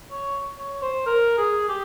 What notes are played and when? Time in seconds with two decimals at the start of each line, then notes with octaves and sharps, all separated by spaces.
0.11 C#5
0.59 C#5
0.82 C5
1.06 A#4
1.38 G#4
1.69 G4